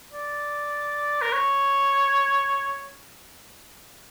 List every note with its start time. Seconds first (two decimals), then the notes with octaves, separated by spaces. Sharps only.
0.13 D5
1.22 A#4
1.33 C#5